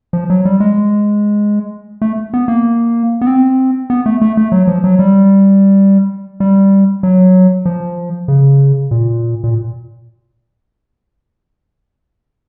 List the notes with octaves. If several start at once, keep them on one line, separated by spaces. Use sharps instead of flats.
F3
F#3
G3
G#3
A3
B3
A#3
B3
C4
B3
A3
A3
A3
F#3
F3
F#3
G3
G3
F#3
F3
C#3
A#2
A#2